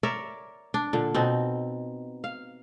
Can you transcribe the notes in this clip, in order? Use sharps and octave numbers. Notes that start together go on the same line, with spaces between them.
A#4 C#5 D5 E5
D4
A#2 D3
B2 C4 D#4
F5